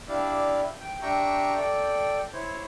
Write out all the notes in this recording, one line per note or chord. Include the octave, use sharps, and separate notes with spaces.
D4 E4 G4 D5 E5 F5
G5
D4 G4 E5 G5 A#5 C#6
A4 D5 G5
E4 C5 C#5